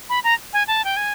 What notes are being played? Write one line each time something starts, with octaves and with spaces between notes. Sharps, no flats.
B5
A#5
G#5
A5
G5
G#5